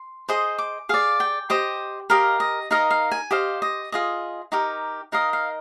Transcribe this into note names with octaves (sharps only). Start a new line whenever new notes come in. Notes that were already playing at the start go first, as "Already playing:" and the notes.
Already playing: C6
G#4 C5 D#5 C6
D6
G#4 D5 F5
G5
G4 C5 D#5
G4 A#4 D#5 F5
D#5
D#4 A#4 D#5 F5
F5
G#5
G4 C5 D#5 F5
D#5
F4 G#4 D#5
D#4 G4 A#4
D#4 A#4 D#5 F5
F5